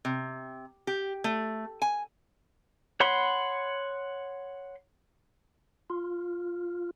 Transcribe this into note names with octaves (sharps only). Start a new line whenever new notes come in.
C3
G4
A3
G#5
C#5 F#5 B5 C6
F4